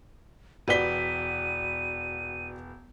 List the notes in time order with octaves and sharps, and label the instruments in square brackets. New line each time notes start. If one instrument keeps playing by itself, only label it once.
[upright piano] E1 B4 G7 [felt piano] F#4 D5 B6 [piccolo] D#7